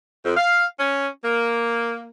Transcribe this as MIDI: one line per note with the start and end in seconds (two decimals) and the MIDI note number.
0.24 0.34 41
0.36 0.64 77
0.80 1.07 61
1.24 2.09 58